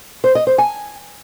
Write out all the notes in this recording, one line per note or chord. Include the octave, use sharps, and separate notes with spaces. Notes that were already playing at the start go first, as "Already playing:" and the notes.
C5
D#5
C5
G#5